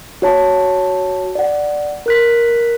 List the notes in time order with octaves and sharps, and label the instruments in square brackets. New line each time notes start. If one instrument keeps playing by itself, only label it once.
[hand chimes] F#4 C#5 A5
D5 F#5
A#4 F#6 B6